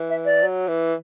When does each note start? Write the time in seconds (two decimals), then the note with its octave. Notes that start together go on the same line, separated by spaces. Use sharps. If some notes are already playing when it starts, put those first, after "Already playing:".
Already playing: E3
0.10 E5
0.25 D5
0.43 F#3
0.68 E3